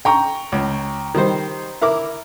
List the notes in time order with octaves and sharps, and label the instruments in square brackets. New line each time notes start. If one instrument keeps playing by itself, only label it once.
[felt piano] G5 A#5 C#6
[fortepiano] C#2
D#3 G3 C5
E4 A#4 D6